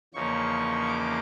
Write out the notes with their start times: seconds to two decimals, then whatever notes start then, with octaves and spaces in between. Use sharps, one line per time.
0.14 E2 C#3 F3 A#3 D#4 C#6
0.88 D6